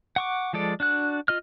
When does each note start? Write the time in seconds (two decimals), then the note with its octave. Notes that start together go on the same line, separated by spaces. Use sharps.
0.16 F#5 C#6 D6
0.53 F3 G#3 A4 D5
0.80 D4 F#4 F#6
1.28 F4 D#5 F6